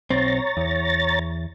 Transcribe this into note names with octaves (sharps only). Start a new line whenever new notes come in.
B1 C4 C#5 A#5 A6
E2